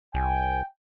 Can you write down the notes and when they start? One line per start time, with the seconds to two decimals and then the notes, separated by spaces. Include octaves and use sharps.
0.14 C2 G5 G#5